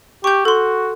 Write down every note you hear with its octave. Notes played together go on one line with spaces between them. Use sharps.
G4 C#6 G6
F#4 A4 C6